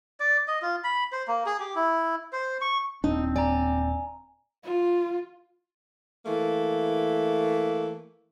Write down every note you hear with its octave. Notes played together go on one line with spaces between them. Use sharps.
D5
D#5
F4
B5
C5
A#3
G#4
G4
E4
C5
C#6
D#1 C4 D4 D#4
D5 G#5 A#5
F4
E3 A3 A#3